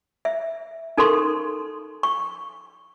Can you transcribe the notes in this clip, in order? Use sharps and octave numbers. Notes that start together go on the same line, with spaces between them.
E5
D#4 A4 A#4 C6 C#6
C#6